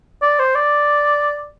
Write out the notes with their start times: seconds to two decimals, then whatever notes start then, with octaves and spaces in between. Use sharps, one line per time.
0.22 D5
0.39 C5
0.55 D5